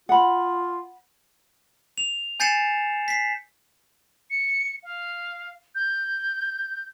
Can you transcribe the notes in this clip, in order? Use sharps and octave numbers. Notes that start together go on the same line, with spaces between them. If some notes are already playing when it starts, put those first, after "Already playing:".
F4 F#5 B5
F7
G#5 G6 A6 C7 C#7 E7
B6 C7
C#7
F5
G6